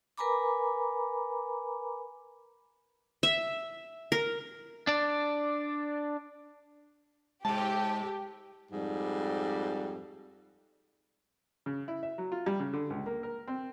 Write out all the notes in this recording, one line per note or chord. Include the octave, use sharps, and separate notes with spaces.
A#4 B4 G#5 A#5 B5 D6
E5
A#4
D4 D5
G#2 C3 G#3 G4 A5
F2 G#2 G3
C#3
E4
E5
F#3
F4
G3
C#3
D3
C#2
A#3
A#4
C4